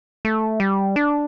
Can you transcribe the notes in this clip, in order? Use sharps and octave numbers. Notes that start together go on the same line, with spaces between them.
A3
G3
D4